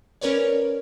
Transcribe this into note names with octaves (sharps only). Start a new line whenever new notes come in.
C#4 A#4 B4 C#5 D5